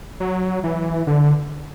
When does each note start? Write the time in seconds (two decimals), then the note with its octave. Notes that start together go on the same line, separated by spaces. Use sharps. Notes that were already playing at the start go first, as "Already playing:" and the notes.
0.20 F#3
0.64 E3
1.07 D3